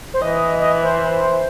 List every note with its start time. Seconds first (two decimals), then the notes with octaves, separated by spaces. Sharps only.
0.14 C5
0.22 E3 D#5
0.59 D#5
0.83 C5